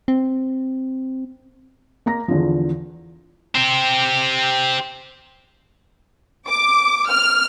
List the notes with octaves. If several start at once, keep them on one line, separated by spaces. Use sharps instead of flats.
C4
A#3 A#5 A#6
E2 D3 F3
C4 G4
D6
F6